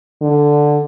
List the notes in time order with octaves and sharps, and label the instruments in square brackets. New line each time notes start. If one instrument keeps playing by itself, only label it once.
[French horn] D3